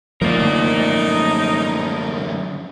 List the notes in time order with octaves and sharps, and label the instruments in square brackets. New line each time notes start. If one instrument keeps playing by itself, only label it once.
[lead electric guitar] F#2 D3 [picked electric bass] F3 A3 A#3 [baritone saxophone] D#4 [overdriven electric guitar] A#4 D5